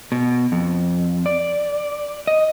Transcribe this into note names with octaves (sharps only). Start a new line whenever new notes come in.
B2
F2
D5
D#5